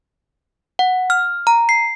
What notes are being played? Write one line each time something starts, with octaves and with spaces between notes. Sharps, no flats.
F#5
F6
A#5
C7